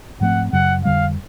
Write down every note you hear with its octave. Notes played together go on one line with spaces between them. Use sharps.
G#2 F3 A3 C4 F#5
F#2 C#3 F#3 F#5
F2 D3 G3 F5